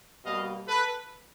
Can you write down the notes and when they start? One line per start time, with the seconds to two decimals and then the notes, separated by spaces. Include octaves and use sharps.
0.25 B2 G3 A#3 D#5 F5
0.68 A4 B4